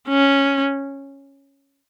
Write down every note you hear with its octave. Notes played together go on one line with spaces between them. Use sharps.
C#4